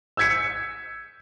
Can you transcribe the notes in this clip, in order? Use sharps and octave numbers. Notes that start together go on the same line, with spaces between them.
E6 G6 G#6 B6 C#7